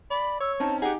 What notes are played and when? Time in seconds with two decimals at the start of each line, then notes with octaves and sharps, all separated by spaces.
0.11 D5 B5
0.40 C#5 E6
0.60 C4 C#4 D#4 A5
0.82 D#4 G4 G#4 F#5